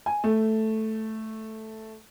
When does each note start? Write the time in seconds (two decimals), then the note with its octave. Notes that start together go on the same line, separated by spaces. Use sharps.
0.06 G#5
0.24 A3